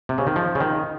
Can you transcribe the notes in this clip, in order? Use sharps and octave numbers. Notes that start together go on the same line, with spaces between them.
C3
C#3
D#3
F3
C#3
D#3